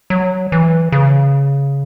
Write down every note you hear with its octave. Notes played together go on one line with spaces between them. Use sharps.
F#3
E3
C#3